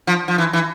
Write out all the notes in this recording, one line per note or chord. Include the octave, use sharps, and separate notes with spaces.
F3
F3
E3
E3